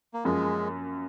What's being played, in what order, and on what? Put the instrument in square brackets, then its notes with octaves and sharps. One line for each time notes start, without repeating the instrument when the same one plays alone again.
[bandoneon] A#3
[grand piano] F#2 F3 A#3 [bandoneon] G#3